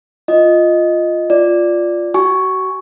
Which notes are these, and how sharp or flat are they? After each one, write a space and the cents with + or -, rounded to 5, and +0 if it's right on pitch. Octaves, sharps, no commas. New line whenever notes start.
F4 +0 D#5 +0
F4 +0 D5 +0
F#4 +35 G#5 +0 C#6 +0